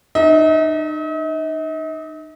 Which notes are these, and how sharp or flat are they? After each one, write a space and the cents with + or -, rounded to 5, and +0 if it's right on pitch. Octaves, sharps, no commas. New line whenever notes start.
D#4 -35 D#5 +45